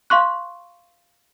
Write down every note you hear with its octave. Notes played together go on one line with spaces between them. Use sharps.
F5 C6 C#6 F#6